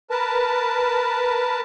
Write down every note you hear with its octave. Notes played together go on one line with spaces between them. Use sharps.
A#4 B4 A5